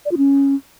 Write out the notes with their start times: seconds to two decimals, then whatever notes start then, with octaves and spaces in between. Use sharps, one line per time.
0.05 D5
0.11 F4
0.18 C#4